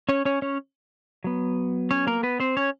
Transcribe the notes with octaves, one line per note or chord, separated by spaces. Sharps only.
C#4 C#5
C#4 C#5
C#4 C#5
F#3 B3
C#4 C#5
A#3 A#4
B3 B4
C4 C5
C#4 C#5